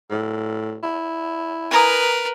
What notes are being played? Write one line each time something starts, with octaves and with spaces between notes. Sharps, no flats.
A2
E4
A#4 B4 G#5 A#5 D#6